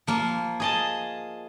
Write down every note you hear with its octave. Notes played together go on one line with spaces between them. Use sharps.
F3 A#3
G#4 D#5 A5